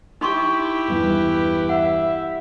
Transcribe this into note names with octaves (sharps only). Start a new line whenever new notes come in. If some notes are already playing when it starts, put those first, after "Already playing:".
D#4 E4 G4 C6 C#6
E2 G2 E3 B4
E5 F#5